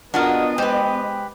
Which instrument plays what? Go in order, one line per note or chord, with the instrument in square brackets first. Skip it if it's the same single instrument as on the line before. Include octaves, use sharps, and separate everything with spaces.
[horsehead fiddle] B3 D#5 [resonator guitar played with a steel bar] D4 F4 A#4 [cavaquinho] F#4 G#4 F5
[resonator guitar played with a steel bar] G#3 C5 G5 [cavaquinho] G4 B4